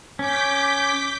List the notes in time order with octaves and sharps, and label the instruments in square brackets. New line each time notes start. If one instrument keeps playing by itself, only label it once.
[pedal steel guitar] C#4 [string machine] D6 G6 B6